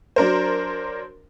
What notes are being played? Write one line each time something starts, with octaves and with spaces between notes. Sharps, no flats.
F#3 D4 A#4 C5